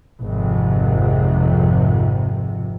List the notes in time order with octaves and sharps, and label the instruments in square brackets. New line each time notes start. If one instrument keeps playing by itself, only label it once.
[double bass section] G#1 F2 C3